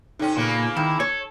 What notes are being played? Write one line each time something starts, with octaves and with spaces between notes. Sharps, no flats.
C3 C#4 D#4 A4 G5
A#2 C#3 A#3 B3
D#3 E4
A4 C#5